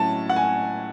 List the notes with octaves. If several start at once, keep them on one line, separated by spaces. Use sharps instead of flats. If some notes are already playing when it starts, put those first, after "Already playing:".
Already playing: A2 F#3 C#4 E4 A5
F#5
G#5